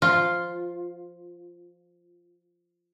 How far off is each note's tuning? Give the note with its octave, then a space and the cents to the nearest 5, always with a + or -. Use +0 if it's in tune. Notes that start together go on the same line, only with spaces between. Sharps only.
F3 -5 F4 +0